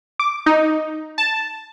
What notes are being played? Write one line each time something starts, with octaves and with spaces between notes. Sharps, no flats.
D6
D#4
A5